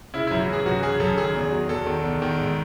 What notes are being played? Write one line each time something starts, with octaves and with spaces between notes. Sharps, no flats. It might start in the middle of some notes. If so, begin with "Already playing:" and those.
C#3 E4
F#2 E4
F#4
E3 G#4
F#2 F#4
C#3 G#4
F#2 A4
D#3 G#4
E2
F#3
E2 A4
D#3
E2
D#3
G#2